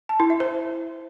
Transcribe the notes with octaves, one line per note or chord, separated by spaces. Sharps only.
A5
E4
E5
C5